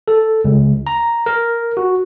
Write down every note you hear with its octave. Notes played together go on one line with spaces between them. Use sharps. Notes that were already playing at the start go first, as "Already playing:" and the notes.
A4
C#2
A#5
A#4
F#4